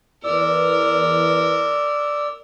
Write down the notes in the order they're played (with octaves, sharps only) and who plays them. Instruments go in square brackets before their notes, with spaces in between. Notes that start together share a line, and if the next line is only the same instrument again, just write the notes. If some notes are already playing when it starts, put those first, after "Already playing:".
[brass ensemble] E2 [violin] A#4 [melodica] D5 E6